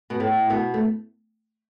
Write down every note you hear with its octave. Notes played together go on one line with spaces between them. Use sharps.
B2 B3
A2 A3
B2 B3
A3